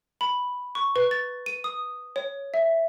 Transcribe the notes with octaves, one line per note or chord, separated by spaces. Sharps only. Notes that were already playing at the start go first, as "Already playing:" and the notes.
B5
C#6
B4
A6
D#7
D#6
C#5
E5